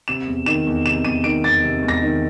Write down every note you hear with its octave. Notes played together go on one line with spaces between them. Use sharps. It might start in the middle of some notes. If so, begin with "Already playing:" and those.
C3 E7
E2
D#3 E7
E2
C3 E7
E2 D#7
D#3 D7
E2 A6
C3
E2
A#6
D#3